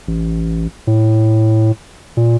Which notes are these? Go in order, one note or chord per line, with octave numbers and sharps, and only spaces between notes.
A1
A2
A#2